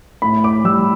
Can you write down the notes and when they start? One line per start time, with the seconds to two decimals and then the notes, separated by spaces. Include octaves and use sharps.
0.22 A2 B5
0.44 D6
0.64 G3 E6